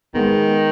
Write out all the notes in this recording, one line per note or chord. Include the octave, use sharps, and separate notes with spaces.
D#3 G#3 B3